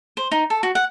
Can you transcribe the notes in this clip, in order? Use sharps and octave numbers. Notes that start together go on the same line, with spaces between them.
C5
D#4
A4
F#4
F#5